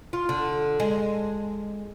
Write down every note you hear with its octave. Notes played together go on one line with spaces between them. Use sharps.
F4
D3
G#3